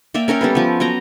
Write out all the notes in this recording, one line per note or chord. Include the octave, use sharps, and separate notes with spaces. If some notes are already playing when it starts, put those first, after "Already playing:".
A#3 D5 E5 G5
C#4 A#4 C#5 G5
G3 B3 A4 B4
F3 B3
F#3 B3 G5 A#5